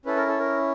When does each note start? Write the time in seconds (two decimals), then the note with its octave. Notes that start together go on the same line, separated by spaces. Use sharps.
0.06 C#4 E4 A4 B4
0.16 A#4
0.27 A4
0.39 A#4